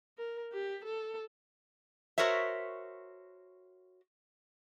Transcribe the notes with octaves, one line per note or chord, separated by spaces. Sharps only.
A#4
G4
A4
F#4 A#4 C5 C#5 E5